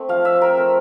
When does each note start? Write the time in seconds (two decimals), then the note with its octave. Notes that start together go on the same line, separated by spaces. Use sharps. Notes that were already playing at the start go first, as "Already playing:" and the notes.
Already playing: A3 C4
0.09 F3 F5
0.25 F3 E5
0.41 C4 A#4
0.57 A3